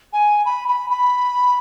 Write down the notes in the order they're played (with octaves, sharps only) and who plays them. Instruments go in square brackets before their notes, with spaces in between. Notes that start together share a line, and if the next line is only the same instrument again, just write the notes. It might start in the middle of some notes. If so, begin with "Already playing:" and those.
[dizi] G#5
B5
B5
B5